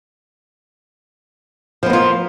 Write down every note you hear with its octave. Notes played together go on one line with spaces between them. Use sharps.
F3 A#3 B3 F4